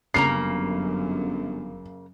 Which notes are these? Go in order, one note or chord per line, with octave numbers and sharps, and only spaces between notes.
G1 F#2 C#3 A#3 A#5 C7